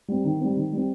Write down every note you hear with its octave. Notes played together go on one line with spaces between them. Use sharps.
G3 C4
D#3
G3 C4
D#3
G3 C4